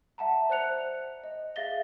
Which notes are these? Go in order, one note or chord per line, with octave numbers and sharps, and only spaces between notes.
E5 F#5 A5 A#5
C5 D5 F#6 C#7 F7
D#5
G#4 E5 F5 A6 A#6 G7